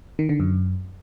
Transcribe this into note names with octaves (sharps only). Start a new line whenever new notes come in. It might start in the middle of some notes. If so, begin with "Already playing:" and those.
D#3
D3
F#2